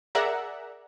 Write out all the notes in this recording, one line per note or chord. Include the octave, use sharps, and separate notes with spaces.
G#4 A#4 D5 E5 F#5 A#5